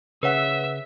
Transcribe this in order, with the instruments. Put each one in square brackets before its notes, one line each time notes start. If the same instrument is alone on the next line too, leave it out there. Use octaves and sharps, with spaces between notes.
[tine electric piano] C#3 [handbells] B4 C#5 F#5 [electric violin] E5